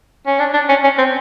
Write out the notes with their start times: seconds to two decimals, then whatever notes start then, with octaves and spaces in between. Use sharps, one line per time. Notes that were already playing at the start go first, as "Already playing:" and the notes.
0.26 C#4
0.39 D4
0.53 D4
0.69 C#4
0.84 C#4
0.98 C4